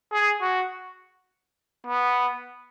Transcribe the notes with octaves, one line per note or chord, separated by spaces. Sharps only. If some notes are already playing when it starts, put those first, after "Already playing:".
G#4
F#4
B3